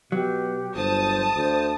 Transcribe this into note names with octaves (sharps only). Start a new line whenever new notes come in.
B2 F#3 G4
G1 C5 A5 D#6
D2 C5